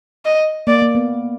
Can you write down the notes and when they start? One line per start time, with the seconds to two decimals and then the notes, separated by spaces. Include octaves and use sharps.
0.25 D#5
0.67 A#3 D5
0.82 A#3
0.95 B3